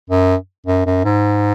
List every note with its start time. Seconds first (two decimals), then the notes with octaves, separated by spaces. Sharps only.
0.10 F#2
0.66 F#2
0.86 F#2
1.05 G#2